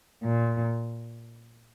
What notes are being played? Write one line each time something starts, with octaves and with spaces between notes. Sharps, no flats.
A#2